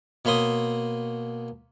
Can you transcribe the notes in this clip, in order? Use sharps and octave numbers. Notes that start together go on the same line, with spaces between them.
B2 A#3 C#5 B5 C6 D#6